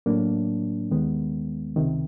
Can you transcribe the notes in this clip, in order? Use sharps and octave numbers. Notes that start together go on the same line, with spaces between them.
A2 F#3 A#3 D4
D#2 D#3 G#3 B3
C#2 C3 D#3